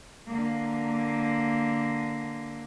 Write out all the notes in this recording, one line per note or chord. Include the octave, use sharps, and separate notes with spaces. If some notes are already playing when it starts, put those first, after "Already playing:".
D3 A#3